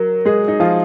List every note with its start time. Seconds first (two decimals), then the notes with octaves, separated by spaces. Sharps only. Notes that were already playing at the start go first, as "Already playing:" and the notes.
Already playing: F#3 A#4
0.25 G#3 G#4
0.48 D#4
0.60 F3 F4